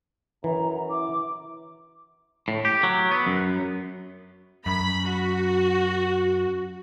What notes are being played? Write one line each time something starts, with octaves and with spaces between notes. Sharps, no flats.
F#2 E3 A#5
E4 D6
A2
G4
F#3
B3
F#2
F#2 B5
F#4